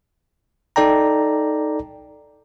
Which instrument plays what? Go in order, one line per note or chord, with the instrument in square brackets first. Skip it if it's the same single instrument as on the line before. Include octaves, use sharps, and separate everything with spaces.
[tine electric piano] D#4 A4 D5 G5 A#5